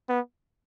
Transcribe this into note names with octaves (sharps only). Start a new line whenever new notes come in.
B3